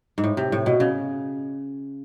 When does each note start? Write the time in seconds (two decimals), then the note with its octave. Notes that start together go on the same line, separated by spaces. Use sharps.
0.18 G#2
0.24 A2
0.37 C3
0.52 A2
0.66 B2
0.80 C#3